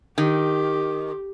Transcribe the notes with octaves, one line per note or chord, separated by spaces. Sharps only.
D#3 G4